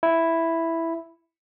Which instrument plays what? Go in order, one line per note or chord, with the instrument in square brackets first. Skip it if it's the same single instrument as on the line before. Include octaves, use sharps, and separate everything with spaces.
[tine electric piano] E4